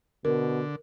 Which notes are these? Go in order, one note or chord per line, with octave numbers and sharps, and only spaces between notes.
B2 D3 A#4